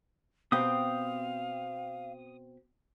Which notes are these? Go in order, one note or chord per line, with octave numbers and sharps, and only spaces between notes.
B2 C4 G4 F5 D#6